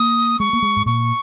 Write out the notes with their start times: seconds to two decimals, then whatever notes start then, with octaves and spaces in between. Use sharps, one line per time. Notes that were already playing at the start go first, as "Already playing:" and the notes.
Already playing: A#3 D#6
0.40 G#3 C#6
0.53 A#3
0.62 G#3
0.76 G#2
0.86 A#2 C#6